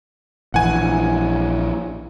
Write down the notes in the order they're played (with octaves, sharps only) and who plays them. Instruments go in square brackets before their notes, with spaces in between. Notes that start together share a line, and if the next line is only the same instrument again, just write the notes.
[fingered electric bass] A#1 E3 [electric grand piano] F#5 G#5